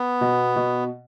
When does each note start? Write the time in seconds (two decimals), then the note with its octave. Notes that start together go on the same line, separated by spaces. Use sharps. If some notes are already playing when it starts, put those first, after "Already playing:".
Already playing: B3
0.21 B2
0.56 B2